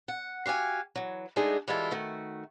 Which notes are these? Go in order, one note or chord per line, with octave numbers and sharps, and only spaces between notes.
F#5
F#4 G4 F5 G#5
E3 F#3
G#3 A3 B3 D4 D#4 G#4
E3 G3 G#3 E4 F4 A4
D#3 A3 F#4